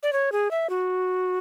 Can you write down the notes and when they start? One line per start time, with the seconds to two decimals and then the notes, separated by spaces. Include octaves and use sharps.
0.03 D5
0.13 C#5
0.32 G#4
0.51 E5
0.70 F#4